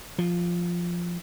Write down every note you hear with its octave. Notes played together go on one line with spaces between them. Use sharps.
F3